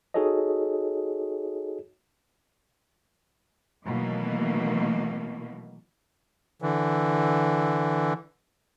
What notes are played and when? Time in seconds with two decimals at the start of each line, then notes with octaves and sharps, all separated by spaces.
0.14 D#4 F#4 G#4 A4 C#5 D#5
3.85 B2 D#3 E3 F#3 A3 A#3
6.62 D3 E3